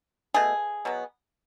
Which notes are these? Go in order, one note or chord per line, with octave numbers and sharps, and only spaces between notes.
B2 A3 G#4
B2 F#3 B3